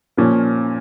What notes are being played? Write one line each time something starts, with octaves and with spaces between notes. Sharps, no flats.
A#2 F3 A#3 C#4